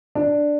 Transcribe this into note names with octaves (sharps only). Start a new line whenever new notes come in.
D4